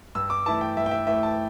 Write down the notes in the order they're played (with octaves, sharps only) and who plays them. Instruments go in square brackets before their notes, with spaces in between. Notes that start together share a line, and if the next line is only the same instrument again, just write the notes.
[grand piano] G2 E6
D6
E3 A3 E4 A5
G5
G2 E5
G5
E5
E3 A3 E4 E5
A5